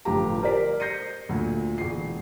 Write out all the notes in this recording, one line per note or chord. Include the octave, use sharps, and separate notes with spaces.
G1 A2 F3 F4 G4 A#5
G4 A#4 C5 D5 B6
G6 A#6 C7 C#7 D#7
D2 A#2
E1 C7